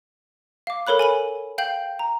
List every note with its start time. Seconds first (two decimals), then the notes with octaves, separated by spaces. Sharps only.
0.67 F5 D6
0.87 A4 A#4 C#5 B5 F#6
0.99 G#5 B5 D#7
1.58 F5 G5 G6 F#7
1.99 A#5